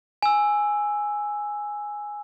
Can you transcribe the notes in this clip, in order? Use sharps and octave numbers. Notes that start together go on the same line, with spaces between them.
G#5 E6